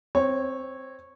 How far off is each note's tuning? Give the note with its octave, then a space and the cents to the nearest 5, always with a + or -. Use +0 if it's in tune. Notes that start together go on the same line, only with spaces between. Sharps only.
C4 +0 C#5 -15